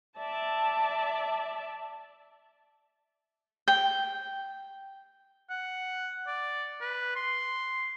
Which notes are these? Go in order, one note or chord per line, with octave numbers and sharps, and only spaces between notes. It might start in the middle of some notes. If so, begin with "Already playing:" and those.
D5 E5 A5
G5
F#5
D5
B4
C6